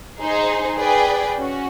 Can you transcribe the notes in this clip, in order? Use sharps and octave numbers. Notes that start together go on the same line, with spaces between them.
D#4 G#4 C5
G#4 B4 D5 G5
C#4 F#4